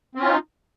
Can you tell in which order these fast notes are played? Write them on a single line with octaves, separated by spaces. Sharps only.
C4 C#4 F4 D#4